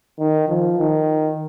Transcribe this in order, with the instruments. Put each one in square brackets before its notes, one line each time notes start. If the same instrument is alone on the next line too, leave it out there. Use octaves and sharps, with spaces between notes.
[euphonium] D#3
F3
D#3